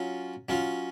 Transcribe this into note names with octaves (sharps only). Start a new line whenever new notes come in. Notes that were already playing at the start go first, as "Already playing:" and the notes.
Already playing: F#3 C#4 F4
F#3 C#4 F4